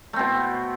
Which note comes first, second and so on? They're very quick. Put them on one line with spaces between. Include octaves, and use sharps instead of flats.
A3 C4 B2